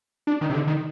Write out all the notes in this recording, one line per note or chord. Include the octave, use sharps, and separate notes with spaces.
D4
D#3
C3
D3
D#3